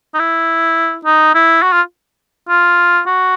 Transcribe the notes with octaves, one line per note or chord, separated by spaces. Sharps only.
D#4
E4
D#4
E4
F#4
F4
F4
F#4